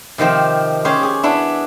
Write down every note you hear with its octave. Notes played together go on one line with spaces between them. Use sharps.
C3 D#3 F3 C4
C#4 G4 G#4 C5
G#4
B3 D4 E4